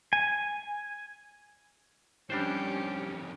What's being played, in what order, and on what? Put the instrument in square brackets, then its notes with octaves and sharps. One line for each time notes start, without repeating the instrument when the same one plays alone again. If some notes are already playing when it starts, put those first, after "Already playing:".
[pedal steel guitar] G#5
[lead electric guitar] F2 D#3 [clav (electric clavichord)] G3 D4 C5 [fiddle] C#4 G4